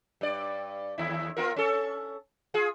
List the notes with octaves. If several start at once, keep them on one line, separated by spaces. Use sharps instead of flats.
G2 D5
D#2 E4
B3 F4 A#4
C#4 A4
F4 G#4